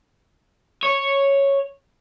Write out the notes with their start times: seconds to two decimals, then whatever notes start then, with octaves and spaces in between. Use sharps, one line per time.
0.83 C#5